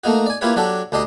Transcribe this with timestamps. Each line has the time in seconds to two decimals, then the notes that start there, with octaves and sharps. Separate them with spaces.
0.04 A3 A#3 D#4 F#4
0.26 D5 G#5
0.41 A#3 E4 F4 G4 B4 C#5
0.56 F#3 D4 F#4 G4 A4
0.92 D2 D4 G4 D#5 C6